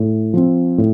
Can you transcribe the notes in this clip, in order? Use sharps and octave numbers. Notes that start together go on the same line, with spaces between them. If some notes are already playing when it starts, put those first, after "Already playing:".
Already playing: A2
F3 C4
A2